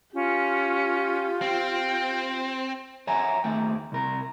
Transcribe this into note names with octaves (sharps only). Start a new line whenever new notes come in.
C#4 F4 G4
C4 G5
C#5 E5 F#5 G#5 A#5
D#2 A3 G5
C2 A#4